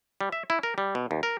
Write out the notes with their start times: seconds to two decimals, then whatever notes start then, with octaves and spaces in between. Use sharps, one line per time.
0.21 G3
0.32 E5
0.50 E4
0.63 A#4
0.78 G3
0.95 B2
1.11 D#2
1.23 A#4